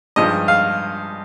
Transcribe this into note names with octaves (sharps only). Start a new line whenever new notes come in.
G2 F3 G#3 D#4 D#5
F5